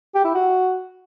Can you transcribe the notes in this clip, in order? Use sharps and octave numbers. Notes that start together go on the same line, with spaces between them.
G4
E4
F#4